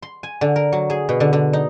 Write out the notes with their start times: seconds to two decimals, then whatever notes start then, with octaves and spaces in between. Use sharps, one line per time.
0.02 C6
0.23 G#5
0.41 D3
0.56 A#4
0.72 F#3
0.90 G#4
1.09 B2
1.20 D3
1.33 D3
1.53 D#4